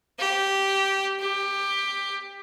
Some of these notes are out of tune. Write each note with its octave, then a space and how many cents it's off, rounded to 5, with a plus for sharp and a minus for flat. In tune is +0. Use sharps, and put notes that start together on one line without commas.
G4 -10
G4 +15